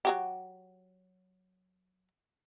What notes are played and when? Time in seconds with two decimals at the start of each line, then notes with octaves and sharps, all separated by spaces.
0.05 F#3 F#4 G4